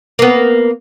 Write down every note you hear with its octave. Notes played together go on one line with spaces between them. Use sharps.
A#3 B3